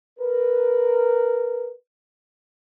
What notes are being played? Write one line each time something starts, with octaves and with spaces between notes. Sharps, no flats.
A#4 B4